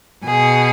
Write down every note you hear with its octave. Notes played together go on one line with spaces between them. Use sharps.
B2 G#4